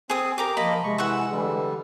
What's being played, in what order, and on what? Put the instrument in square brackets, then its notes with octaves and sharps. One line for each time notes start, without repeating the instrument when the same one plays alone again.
[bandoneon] C4 [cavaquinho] G#4 D#6
[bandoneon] G4 [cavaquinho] A#4 A#5 D6
[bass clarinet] F3 [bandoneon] A#3 D#5 [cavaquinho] B5
[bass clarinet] C3 [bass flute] G#3 [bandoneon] C#6
[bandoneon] E3 E6 [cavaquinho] F#5 C#6
[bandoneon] D3 G3 [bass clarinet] E3